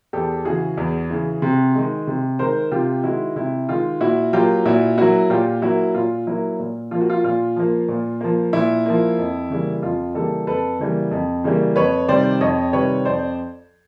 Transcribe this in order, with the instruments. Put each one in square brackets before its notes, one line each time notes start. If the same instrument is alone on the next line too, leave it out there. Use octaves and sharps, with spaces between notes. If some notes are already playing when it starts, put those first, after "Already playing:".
[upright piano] E2 G4 A4
C#3 E3 F#4 G#4
E2
C#3 E3
C3
D#3 G#3
C3
D#3 G#3 A#4 C5
C3 F4 G4
D#3 G#3 E4 F#4
C3 E4
D#3 G#3 F4
A#2 E4 F#4
F#3 A#3 F4 G4
A#2 E4 F#4
F#3 A#3 E4 F#4
A#2 F4 G4
F#3 A#3 E4 F#4
A#2 F4
F#3 A#3 E4
A#2
F3 A#3 F4
F#4
F4
A#2 F4
F3 A#3
A#2
F3 A#3
A#2 E4
F3 A#3
F2
C#3 E3 G3 A#3
F2 F4
C#3 E3 G3 A#3 G4 A4
F2 A4 B4
C#3 E3 G3 A#3
F2
C#3 E3 G3 A#3
F2 B4 C#5
C3 D#3 G3 C5 D5
F2 C#5 D#5
C3 D#3 G3 B4 C#5
F2 C5 D5